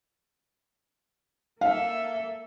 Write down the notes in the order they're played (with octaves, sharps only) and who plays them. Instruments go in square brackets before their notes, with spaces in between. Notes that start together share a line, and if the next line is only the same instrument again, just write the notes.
[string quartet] A#3 A4 E5 [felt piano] F5